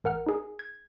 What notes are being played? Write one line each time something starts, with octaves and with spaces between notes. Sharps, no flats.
A1 A#4 F#5 F6
D#4 G#4
G#6